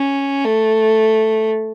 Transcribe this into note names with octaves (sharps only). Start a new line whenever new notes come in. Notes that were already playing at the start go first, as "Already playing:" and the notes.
Already playing: C#4
A3